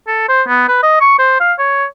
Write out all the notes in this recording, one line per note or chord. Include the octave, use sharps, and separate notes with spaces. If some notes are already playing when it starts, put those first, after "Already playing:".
A4
C5
B3
B4
D#5
C#6
C5
F5
C#5